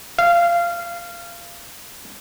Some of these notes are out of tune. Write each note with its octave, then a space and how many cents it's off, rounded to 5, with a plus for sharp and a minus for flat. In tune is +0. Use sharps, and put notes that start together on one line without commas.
F5 -20